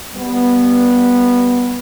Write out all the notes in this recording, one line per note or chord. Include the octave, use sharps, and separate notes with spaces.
G3 B3